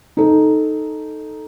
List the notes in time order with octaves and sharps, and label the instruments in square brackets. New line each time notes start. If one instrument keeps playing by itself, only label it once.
[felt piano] D#4 A4